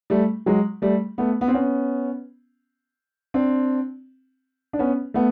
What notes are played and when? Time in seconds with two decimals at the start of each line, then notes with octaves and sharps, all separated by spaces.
0.10 G3 A3
0.46 F#3 G#3
0.82 G3 A3
1.18 A3 B3
1.41 B3
1.48 C4
1.54 B3 C#4
3.34 C4 D4
4.73 D4
4.79 B3 C#4
5.14 A3 B3